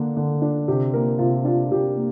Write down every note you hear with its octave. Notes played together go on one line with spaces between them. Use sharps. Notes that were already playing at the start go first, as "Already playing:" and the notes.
Already playing: D3 A#3 D4
D3
D4
C3 G4
A#3 A#4
C3 F4
D4 F4
C3 G4
A#3